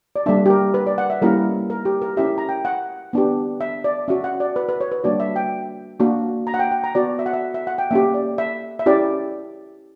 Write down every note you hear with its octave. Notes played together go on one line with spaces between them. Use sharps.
D5
G3 A#3 D4 E5
G4
A#4
B4
D5
F#5
E5
G3 A#3 C#4 E4 G4 A#4
A#4
G4
A#4
C#4 E4 G4 E5
A#5
G5
F#5
B3 D4 G4
E5
D5
C#4 F#4 E5
F#5
D5
B4
B4
C#5
B4
G3 A#3 D4 F#4 D5
E5
G5
A#3 D4 F#4
A#5
F#5
G5
G5
A#5
B3 F#4 D5
E5
F#5
E5
E5
F#5
G5
A#3 C#4 G4 E5
D5
E5
E5
C#4 E4 G4 D5